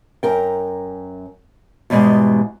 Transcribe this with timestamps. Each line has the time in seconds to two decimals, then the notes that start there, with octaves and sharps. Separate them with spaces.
0.23 F#2 A#4 G5
1.90 E2 G#2 B2 G3 G#3